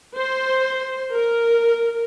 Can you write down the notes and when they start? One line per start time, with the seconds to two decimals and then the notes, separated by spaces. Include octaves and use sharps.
0.16 C5
1.15 A#4